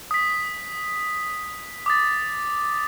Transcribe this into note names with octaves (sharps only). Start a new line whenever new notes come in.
D#6 B6
D6 D#6 A6